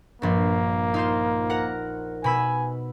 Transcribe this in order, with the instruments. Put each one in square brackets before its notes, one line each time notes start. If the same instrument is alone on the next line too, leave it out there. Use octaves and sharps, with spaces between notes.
[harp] A#1 G2 [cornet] A#3
[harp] D#4 F4 C5
A#4 F#5
[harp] B2 B5 E6 [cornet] G#5